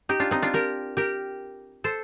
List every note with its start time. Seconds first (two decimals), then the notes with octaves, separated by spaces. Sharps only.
0.09 D#4 G4
0.20 D4 F4
0.31 C4 D#4
0.42 D4 F4
0.54 G4 A#4
0.97 G4 A#4
1.84 A4 C5